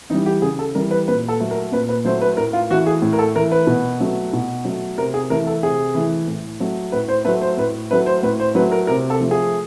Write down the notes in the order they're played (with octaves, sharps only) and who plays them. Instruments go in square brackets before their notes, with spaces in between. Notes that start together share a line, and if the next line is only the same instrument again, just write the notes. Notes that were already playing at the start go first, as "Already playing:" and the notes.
[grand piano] E3 G3 D#4
G4
C#3 G#4
A4
E3 G3 A#4
B4
A#2 B4
A4
F#3 A3
A#4
A#2 B4
B4
F#3 A3 C5
B4
A2 A#4
F4
E3 F#4
A3
G#4
A2
A#4
A4
E3 A3 A#4
B4
B2
F#3 A3
B2
F#3 A3
C3 A#4
G#4
E3 A3 A#4
A4
C3 G#4
E3 A3
A2
F#3 A3
A2 B4
C5
F#3 A3 B4
C5
A2 B4
F#3 A3 B4
C5
A2 B4
C5
F#3 B4
A3
A#4
C3 A#4
A4
F3 A3
G#4